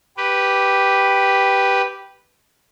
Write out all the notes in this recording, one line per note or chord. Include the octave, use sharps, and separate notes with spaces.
G4 B4